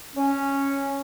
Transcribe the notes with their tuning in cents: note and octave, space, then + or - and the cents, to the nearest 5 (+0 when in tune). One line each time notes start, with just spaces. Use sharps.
C#4 -5